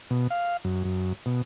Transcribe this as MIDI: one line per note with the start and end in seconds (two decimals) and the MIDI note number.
0.10 0.27 47
0.31 0.57 77
0.64 0.84 42
0.84 1.13 42
1.26 1.42 47